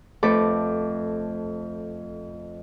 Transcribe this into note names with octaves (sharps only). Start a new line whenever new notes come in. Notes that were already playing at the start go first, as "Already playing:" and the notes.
F2 A3 A4 B4 D6